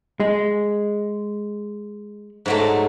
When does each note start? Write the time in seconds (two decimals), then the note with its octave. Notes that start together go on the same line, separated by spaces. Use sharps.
0.20 G#3
2.46 G#2 F#3 A3